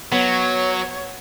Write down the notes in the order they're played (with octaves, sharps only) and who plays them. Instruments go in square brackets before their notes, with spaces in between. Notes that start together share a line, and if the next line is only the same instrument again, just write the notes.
[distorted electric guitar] F#3 [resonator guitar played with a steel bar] B3 [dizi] C#5